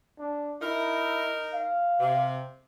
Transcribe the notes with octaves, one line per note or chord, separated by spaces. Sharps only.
D4
D#4 E4 A#4
F5
C3